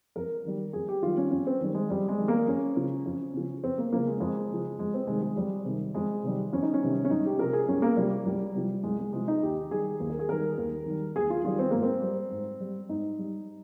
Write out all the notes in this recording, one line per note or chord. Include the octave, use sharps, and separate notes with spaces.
F2 A#4
D#3 G3
F2 G#4
G4
D#3 G3 F4
C#4
F2 C#4
C4
D#3 G3
G#3
F2 G3
G#3
D#3 G3
A#3
F2 C#4
C#3 F3
F2
C#3 F3
F2 C4
A#3
C#3 F3 A#3
G#3
F2 G#3
C#3 F3
F2 G#3
C4
C3 D#3 G3 G#3
G#3
F2 G3
C3 D#3 G3
F2 G#3
C3 D#3 G3
F2 C#4
D#4
C#4
C3 D#3 G3
C#4
C2 D#4
G4
C3 F3 A#4
G#4
C2 C#4
A#3
C3 F3 G3
C2 G3
C3 F3 G3
C2 G#3
G#3
C3 F3 G#3
D#4
D#2 G4
D#3 G3 G#4
D#2
A#4
G#4
D#3 G3 A#4
D#2
D#3 G3
D#2 G#4
F4
D#3 G3 F4
C4
G#2 A#3
C4
G3
G#2
G3
G#2 D#4
G3